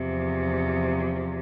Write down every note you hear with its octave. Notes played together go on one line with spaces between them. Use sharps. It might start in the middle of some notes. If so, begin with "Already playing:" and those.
Already playing: E2 C3 F3